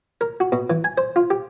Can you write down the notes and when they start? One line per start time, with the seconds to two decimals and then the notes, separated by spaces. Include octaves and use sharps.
0.21 A#4
0.40 F#4
0.52 B2
0.70 E3
0.84 G#5
0.98 C5
1.16 F4
1.30 G4